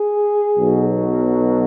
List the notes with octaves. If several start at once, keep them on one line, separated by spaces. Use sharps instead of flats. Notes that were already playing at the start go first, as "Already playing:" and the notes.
Already playing: G#4
B1 B2 F#3